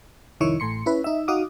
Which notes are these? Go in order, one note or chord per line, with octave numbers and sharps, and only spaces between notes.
C2 F2 D#3 E4 C#5 C#6
A1 A2 C6 C#7
C#4 E4 B4
D#4 E5
D#4 F#4 F5 D6 D#6